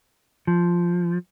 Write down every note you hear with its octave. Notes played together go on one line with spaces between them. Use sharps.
F3